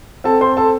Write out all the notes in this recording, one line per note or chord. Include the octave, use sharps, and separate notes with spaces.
C4 A4 A5
C5 C6
A4 A5